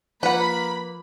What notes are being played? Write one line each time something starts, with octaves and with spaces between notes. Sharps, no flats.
F3 A#3 B4 F#5 B5